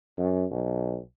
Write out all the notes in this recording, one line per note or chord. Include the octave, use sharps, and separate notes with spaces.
F#2
B1